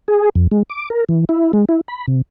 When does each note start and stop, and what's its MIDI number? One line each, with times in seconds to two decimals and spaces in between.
0.08 0.29 68
0.35 0.47 41
0.52 0.63 56
0.70 0.89 86
0.90 1.04 70
1.09 1.25 52
1.29 1.52 64
1.53 1.65 56
1.69 1.81 64
1.88 2.06 83
2.08 2.22 48